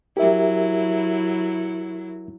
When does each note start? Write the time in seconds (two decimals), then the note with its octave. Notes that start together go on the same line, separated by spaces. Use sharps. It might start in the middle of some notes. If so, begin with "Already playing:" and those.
0.17 F#3 E4 G4 A#4 E5